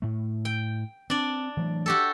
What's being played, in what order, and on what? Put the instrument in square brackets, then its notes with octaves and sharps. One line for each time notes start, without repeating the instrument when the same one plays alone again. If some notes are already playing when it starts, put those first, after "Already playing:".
[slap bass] A2 A3
[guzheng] G5
[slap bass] C4 [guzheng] D4 D5
[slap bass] E3 F#3 A3
[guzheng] F#4 G4 A4